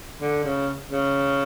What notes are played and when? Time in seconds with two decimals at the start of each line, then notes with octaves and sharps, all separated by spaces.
0.20 D3
0.44 C#3
0.89 C#3